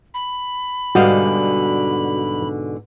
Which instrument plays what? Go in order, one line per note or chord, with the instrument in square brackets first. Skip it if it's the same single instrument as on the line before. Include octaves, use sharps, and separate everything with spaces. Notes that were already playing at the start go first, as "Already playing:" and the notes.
[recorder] B5
[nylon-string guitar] G#2 B2 D3 [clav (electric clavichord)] G3 D#5 F5 [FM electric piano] F#4